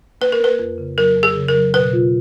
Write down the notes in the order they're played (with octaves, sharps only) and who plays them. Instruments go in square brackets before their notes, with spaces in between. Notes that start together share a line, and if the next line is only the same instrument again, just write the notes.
[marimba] A#3 [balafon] B4
[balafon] A#4
[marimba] A#3 [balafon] B4
[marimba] F2
C#3
[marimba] F#3 [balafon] A#4
[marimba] F2
[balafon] G#4
[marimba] C#3
[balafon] A#4
[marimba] F#3
[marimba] B2 [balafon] B4
[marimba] F4